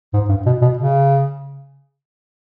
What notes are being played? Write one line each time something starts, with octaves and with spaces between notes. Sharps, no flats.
G#2
G2
B2
B2
C#3